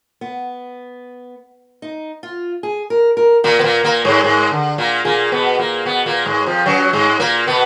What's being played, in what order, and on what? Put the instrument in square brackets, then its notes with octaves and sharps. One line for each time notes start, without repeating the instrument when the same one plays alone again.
[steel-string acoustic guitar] B3
D#4
F4
G#4
A#4
A#4
[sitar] A#2 A#3 [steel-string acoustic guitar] A#4
[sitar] B3
A#2 A#3
A#2 A#3
G#2 G#3
G#2 G#3
D3
A#2 A#3
[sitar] A#2 A#3 [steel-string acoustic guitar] G#4
[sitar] B2 B3
A#2 A#3
B2 B3
A#2 A#3
G#2 G#3
F2 F3
F#2 F#3
G#2 G#3
A#2 A#3
[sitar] B2 B3 [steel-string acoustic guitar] B4